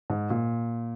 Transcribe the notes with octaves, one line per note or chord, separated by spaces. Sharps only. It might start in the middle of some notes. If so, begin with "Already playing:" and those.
G#2
A#2